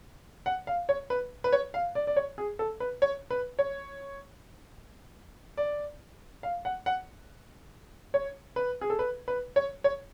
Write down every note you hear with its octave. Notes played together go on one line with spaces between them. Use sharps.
F#5
F5
C#5
B4
B4
C#5
F5
D5
D5
C#5
G#4
A4
B4
C#5
B4
C#5
D5
F5
F#5
F#5
C#5
B4
G#4
A4
B4
B4
C#5
C#5